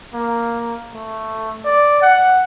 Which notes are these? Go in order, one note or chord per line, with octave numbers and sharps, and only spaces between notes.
A#3
A3
D5
F#5